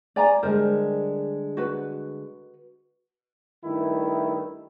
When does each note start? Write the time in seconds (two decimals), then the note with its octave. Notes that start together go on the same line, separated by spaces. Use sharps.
0.16 D5 G#5 A#5
0.43 D3 G3 G#3 A#4 C5
1.57 F#4 B4
3.64 G2 D#3 A3 E4